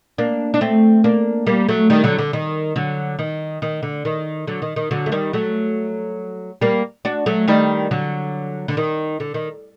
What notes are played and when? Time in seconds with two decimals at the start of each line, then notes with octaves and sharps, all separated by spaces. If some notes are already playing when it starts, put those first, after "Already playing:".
0.18 A#3 D4
0.54 D4
0.61 A3 C4
1.04 A#3 D4
1.47 G3 A#3
1.69 F#3 A3
1.90 D#3 G3
2.04 D3 F#3
2.19 D3
2.33 D#3
2.76 D3 F#3
3.19 D#3
3.62 D#3
3.83 D3
4.05 D#3
4.47 D3 F#3
4.62 D#3
4.76 D#3
4.91 D3 F#3
5.06 A3
5.12 D#3 G3
5.33 F#3 A3
6.61 G3 A#3
7.05 D4 F#4
7.26 F#3 A3
7.48 D#3 G3
7.91 D3 F#3
8.68 D3
8.77 D#3
9.20 D3
9.34 D#3